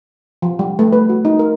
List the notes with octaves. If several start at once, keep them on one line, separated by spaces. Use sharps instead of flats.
F3
G3
A3
B4
F#4
D#4
A#4